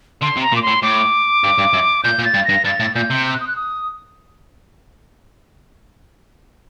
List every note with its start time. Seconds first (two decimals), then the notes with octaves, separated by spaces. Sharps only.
0.22 D3 C6
0.37 C3
0.42 A#5
0.52 A#2
0.56 D6
0.63 A2 C6
0.83 A2 D6
1.44 G2
1.58 G2
1.73 F#2
2.04 A#2 G6
2.19 A#2
2.25 A6
2.34 G2
2.45 G2 A#6
2.65 G2 A6
2.80 A2
2.95 A#2 G6
3.10 C3
3.26 G6
3.33 F#6
3.40 D#6
3.48 F#6
3.56 D#6